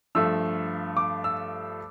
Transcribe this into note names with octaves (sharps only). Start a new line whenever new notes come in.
G2 F3 A3 E6
D6
E6